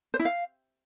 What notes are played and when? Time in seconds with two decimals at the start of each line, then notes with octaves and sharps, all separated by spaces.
0.14 C5
0.19 E4
0.25 F5